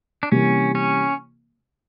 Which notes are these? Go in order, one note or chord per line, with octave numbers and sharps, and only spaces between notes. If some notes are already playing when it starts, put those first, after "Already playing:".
D4
C3 E3 G3 A#3 C#4
C#4